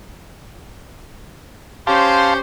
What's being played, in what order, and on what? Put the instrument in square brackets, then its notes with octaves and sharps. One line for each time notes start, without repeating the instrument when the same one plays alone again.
[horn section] C#4 G4 C5 [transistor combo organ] F5 A5 C6